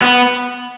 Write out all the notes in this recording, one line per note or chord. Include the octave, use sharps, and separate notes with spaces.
B3